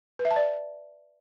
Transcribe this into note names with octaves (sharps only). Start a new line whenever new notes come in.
B4
E5
A5
D5